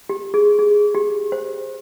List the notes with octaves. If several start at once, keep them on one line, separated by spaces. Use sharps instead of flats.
G4
G#4
G#4
G4
C5